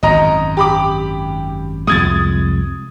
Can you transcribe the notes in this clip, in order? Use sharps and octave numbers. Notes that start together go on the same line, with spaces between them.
G#1 F#2 D#5 A#5
G4 B5 D6
C2 F2 G#3 D#6 G#6 A6